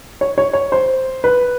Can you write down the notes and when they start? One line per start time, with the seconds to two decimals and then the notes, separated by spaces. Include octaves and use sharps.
0.21 C#5
0.38 C#5
0.53 C#5
0.72 C5
1.24 B4